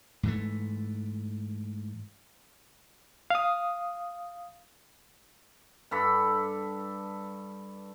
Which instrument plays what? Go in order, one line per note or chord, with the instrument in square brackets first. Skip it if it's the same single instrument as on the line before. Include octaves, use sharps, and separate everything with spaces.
[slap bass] G#2 E3 A3
[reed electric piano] F5 D#6
[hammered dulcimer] G2 A4 B5